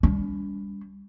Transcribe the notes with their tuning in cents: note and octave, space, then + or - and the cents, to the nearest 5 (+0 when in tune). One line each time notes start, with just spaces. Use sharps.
G3 +30 D4 -45